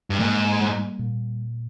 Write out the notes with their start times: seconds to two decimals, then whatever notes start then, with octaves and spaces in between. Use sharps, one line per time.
0.10 G2
0.20 G#2 A#3
0.60 G3
0.99 A#2